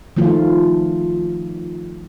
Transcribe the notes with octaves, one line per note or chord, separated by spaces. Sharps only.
D#3 F3 A3 F4